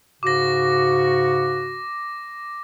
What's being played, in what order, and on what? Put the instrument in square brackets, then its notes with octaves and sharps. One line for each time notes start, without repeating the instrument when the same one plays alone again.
[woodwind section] G#2 C#3 F#4 [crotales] D6 A#6